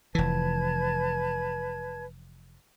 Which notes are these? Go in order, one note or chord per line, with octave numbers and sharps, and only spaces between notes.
F1 E3 B4 A5 G#6